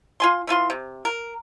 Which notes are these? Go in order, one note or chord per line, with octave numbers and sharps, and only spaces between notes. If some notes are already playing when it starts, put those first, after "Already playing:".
F4 G#5 C6
E3 A3 F4 C6
C3
A#4